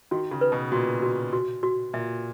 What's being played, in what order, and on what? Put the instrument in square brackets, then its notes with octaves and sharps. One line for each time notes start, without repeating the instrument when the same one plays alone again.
[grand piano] D#3 [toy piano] F#4
[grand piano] C#3
[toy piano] B4
[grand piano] B2
[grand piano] A#2 [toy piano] F#4
[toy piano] F#4
F#4
F#4
[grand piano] A#2 [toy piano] E5